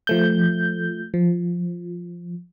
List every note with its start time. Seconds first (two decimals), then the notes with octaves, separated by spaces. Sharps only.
0.07 F3 A3 G6
1.14 F3